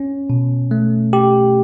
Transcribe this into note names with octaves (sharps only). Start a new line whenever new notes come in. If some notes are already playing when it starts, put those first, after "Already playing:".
Already playing: C#4
B2
A3
G4